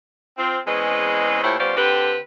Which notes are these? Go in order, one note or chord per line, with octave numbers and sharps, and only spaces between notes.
C4 F4
E2 G#3 C4 C#4 B4 D#5
A#2 A3 E4 G4 C5 C#5
G3 B3 C#4 F4 C5 D5
D3 C4 G4 B4